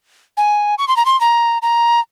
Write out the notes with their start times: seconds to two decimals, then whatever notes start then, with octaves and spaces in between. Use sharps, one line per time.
0.37 G#5
0.78 C#6
0.88 C6
0.96 A#5
1.05 C6
1.21 A#5
1.62 A#5